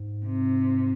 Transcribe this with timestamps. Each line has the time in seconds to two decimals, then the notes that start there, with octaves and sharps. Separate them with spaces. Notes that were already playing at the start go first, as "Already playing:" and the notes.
Already playing: G#2
0.26 C3